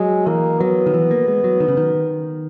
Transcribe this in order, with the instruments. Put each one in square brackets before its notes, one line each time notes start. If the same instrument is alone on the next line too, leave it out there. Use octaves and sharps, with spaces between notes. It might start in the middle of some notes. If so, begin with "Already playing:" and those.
Already playing: [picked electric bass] F#3 [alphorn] G#3
[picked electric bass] E3 [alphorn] A#3
[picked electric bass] F#3 [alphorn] B3
[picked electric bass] D#3
E3
A#3
G#3
F#3
D#3
C#3
D#3